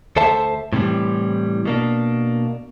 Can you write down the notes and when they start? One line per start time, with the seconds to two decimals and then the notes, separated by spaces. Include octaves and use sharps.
0.16 D2 A4 C5 E5 A5
0.73 A2 C3 E3 G3
1.65 B2 A#3 D4